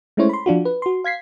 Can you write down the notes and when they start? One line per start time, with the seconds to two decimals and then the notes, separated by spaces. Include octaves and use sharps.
0.17 G#3 A3 C#4 E4 C5 C#5
0.29 B5 C6
0.46 F3 D4 F4 F#4
0.65 B4
0.82 F#4 C6
1.04 F5 G#6 B6 C7